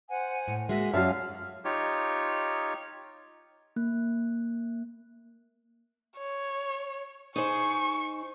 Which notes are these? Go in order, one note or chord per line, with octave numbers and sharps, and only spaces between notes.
C5 F#5 G#5
A2
G#3 A#3 F#4 E5
F#2 F#3 C#4 C#5 D5 E5 F5 A5
D#4 F4 G4 C#5
A#3 F#6
C#5
D#4 G#4 C5 C#6